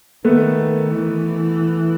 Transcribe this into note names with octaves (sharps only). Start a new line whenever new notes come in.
D#3 A3 B3
E3